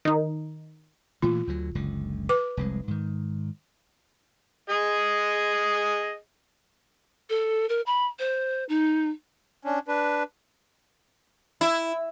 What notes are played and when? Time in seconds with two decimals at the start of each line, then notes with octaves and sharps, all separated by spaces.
0.05 D#3 D#4
1.22 A#2 E3 A3 F4
1.47 D2 D3 F#3
1.75 F#1 C#2 D3
2.29 B4 D6
2.57 F1 C2 G#3
2.88 G#2 D#3
4.70 G#4 D#5
7.30 A4
7.69 A#4
7.86 B5
8.19 C5
8.69 D#4
9.65 C#4 D4
9.88 D4 B4
11.61 E4